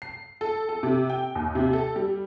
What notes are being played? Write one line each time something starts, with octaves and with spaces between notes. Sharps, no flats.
C7
A4
A4
C3
G5
D#2
C3
A4
G3